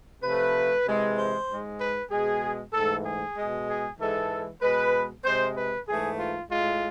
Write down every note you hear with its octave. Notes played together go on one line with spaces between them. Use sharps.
C3 F3 A3 B4
C3 E3 G#3
C5
G#2 G#3
B4
B2 G#3 G#4
G#2 E3 A3 A4
G#4
B2 G#3
G#4
G#2 E3 G#3 A4
B2 G#3 B4
C3 G#3 C5
B4
G#2 E3 A3 G#4
F4
A2 G#3 F4